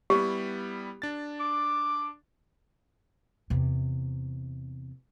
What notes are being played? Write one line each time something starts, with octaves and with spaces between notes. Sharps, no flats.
G3 B3 E4 G4
D4 A6
D6
E2 C3